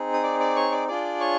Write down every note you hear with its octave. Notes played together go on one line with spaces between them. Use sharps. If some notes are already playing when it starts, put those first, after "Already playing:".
Already playing: C4 D#4 G#4
D#6
D5 D6
D5 D6
C#5 C#6
D5 D6
D4 F4 G#4 D5 D6
C#5 C#6